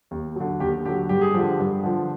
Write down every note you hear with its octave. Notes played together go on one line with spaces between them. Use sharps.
D#2
D3 F#3
D#2 G4
D3 F#3 G4
G2 G4
G#4
D3 F3 G4
G2
D3 F3